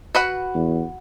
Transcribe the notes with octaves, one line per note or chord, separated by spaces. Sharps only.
F#4 B4 F#5
E2